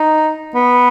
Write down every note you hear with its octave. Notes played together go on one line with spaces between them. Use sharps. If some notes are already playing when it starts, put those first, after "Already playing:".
Already playing: D#4
B3